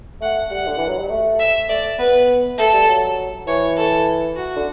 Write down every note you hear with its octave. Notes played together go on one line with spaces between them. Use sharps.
A3 F#5
G3 F#5
D3
E3
F#3
G3
A3
E5
A3 D5
B3 B4
A3 A4
G3
F#3
E3 C#5
A4
F#4
D3